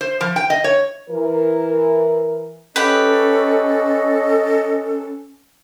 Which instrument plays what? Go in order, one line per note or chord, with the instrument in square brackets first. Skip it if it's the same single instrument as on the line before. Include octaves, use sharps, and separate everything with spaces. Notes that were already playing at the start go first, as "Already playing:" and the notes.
[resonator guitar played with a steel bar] C5
F3
G5
D#5
C#5
[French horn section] E3 A#4
[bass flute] C#4 [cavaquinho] G4 B4 [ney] A4 [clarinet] D#5